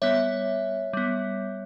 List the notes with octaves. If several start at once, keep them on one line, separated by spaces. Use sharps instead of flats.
G3 B3 C#5 E5
G3 B3